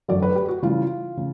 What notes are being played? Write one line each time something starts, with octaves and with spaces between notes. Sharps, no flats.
F#2 D3 F#3 D5
B4
G4
F#4
C#3 E3 G3 F4
C#3